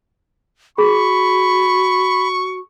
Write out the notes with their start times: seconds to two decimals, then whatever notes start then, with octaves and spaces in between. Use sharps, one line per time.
0.78 F#4 G#4 B5 C#6